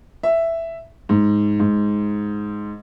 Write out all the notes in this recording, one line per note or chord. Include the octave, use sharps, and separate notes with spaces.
E5
G#2
G#2